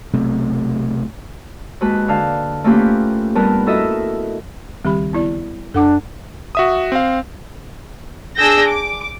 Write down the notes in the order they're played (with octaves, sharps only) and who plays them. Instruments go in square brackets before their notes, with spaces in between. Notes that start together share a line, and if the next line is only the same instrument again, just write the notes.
[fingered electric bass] B1 C3 A3
[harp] D#2 G#3 F#4 B4 A5
D3 F5 A5
A3 A#3 C#4 F4 G4 B4
G2 G3 B3 A#4 B4 A5
E4 F#4 A4 A#4 D#5 E5
[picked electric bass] C#2 D#3 C4 [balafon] G3 G4 B5
[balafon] B3 E4 D5
[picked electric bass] F#2 [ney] D4 [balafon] A4 F#5 D6
[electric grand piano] F#4 E5 D#6
C4 F5
[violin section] D4 G#4 E6 G6 A#6
D6